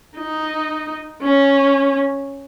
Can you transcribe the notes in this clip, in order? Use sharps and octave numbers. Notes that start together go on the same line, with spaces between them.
D#4
C#4